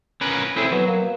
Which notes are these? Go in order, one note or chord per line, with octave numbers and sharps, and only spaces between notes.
C#4 A#4 B4
A2 C4 E4 G#4
F#3 B3
A#3